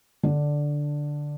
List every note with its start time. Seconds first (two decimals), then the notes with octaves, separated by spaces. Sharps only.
0.23 D3 D4